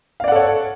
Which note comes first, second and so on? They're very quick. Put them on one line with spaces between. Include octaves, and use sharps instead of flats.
F5 D5 F#5 A4 C#5